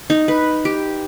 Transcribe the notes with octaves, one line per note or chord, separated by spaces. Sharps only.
D#4
B4
G4